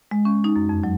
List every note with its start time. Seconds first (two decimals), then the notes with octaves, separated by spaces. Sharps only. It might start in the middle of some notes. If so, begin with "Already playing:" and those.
0.11 G#3
0.25 C#4
0.44 D#4
0.56 F#2
0.69 F2
0.83 F#3